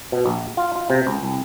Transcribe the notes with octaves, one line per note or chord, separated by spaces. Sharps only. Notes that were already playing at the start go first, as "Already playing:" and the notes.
B2
A#1
F4
F4
C3
C#2
C2